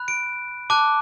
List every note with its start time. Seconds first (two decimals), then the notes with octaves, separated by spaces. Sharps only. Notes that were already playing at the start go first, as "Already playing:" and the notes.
Already playing: B5 F#6
0.08 D7
0.70 A5 D6 F#6